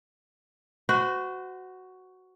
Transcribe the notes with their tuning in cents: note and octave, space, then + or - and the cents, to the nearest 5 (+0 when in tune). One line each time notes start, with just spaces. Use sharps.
F#4 +5 C5 -35